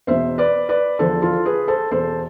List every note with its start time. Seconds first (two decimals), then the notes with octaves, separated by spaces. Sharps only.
0.07 E2 B2 C5 E5
0.38 B4 D5
0.69 B4 D5
0.99 E2 D3 F3 A4 C5
1.22 F4 A4
1.46 G#4 B4
1.68 A4 C5
1.91 E2 B2 A4 C5